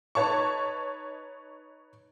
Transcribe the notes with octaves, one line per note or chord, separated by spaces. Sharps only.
D#4 B4 C#5 A5 C#6